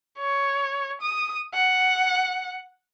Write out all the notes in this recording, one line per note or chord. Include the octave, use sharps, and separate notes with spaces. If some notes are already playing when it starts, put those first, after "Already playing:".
C#5
D#6
F#5